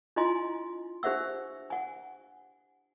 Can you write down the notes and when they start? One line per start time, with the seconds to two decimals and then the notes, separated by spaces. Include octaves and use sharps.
0.16 D4 E4 F4 D#5 G#5 C6
1.03 D4 G4 C5 E5 F#5 E6
1.70 F#5 G#5